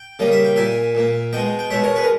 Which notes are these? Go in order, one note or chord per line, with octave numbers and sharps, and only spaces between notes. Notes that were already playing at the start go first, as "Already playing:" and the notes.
Already playing: G5
C#3 G3 A#3 D#5
E5
G5
A#2 A#3 E5 G#5
A#2 A#3
B2 G#3 D#5 G5
G5
B2 G#3 C#5 E5
A#4 C#5
G#4 B4
A#4